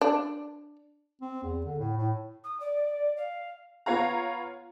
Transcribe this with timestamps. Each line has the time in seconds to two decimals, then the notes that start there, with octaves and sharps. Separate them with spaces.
0.01 D4
1.21 C4
1.43 E2
1.65 D3
1.79 A2
1.97 A2
2.44 D#6
2.60 D5
3.17 F5
3.86 B3 F4 C#5 F5 A#5